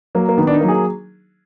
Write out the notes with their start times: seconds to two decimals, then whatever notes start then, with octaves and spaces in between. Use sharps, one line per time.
0.15 F#3 A#3
0.29 A#3
0.37 D#3 B3
0.47 D4
0.53 D#4
0.61 F#3 A#3
0.68 G#4